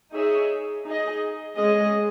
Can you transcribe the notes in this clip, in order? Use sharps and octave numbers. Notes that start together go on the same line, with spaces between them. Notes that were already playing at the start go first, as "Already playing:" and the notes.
D#4 G#4 C#5 E5
D#4 G#4 D#5
G#3 C#4 G#4 D#5